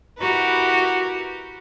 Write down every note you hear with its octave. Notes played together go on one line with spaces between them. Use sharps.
E4 F#4 G4 A#4 B4